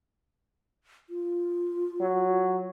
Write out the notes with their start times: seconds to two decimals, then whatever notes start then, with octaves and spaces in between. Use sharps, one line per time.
1.10 F4
2.01 F#3